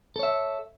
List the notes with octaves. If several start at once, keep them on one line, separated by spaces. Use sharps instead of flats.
A4 C#5 E5